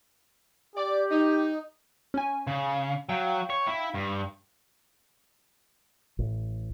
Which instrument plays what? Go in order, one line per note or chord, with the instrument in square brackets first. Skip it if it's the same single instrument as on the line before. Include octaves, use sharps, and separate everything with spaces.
[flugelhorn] G4 [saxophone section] D5
[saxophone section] D#4
[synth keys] C#4 G#5
[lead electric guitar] C#3
[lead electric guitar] F#3 [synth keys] F5 G5
[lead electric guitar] C#5
E4
G2
[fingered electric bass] A1